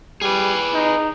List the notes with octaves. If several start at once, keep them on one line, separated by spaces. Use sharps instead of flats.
G3 G#4 B4
D#4